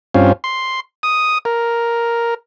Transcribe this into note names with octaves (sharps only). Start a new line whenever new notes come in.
G2 C4 C#4 F4
C6
D#6
A#4